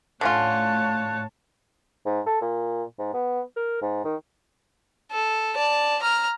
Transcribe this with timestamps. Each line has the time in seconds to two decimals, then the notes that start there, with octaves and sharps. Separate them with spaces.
0.21 A2 D3 C#4 F4 C#5 A5 F#6
2.06 G#2
2.26 A4
2.41 A#2
2.99 G#2
3.14 B3
3.56 A#4
3.82 G#2
4.04 D#3
5.12 A4
5.55 D5 A5
6.02 A#5 F6